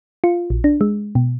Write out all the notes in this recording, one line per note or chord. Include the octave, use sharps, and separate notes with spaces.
F4
A#1
D4
G#3
B2